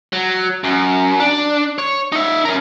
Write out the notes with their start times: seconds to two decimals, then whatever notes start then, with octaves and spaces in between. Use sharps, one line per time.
0.13 F#3
0.64 F#2
1.20 D4
1.78 C#5
2.12 D#4 E5
2.45 C#4 A#4